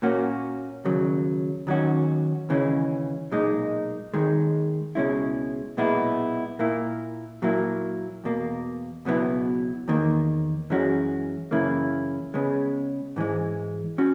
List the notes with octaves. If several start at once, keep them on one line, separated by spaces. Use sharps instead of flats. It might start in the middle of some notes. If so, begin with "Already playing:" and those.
A#2 A#3 C#4 F#4
D#2 C#3 F#3
D#2 D#3 F#3 C#4 F#4
D#2 C#3 E3 G#3 C#4
B1 A#2 G#3 D#4
D#2 D#3 G#3
C#2 B2 G#3 C#4 E4
B1 A#2 G#3 B3 E4
A#2 A#3 E4
A#2 F#3 A#3 E4
E2 B2 A#3
C#2 B2 F#3 B3 E4
E2 D#3 A#3
F#2 E3 G#3 C#4 F#4
F#2 C#3 E3 A#3 E4
C#3 G#3 B3
G#2 E3 G#3
C#4 F#4